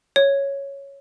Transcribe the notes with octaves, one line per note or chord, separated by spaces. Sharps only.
C#5